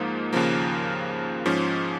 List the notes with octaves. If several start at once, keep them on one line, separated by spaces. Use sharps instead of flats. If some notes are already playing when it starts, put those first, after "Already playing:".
Already playing: G#2 F3 A#3 D#4
D#2 C#3 F3 A#3
G#2 F3 C#4